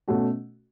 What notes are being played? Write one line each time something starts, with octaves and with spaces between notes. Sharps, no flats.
B2 A3 C#4 F#4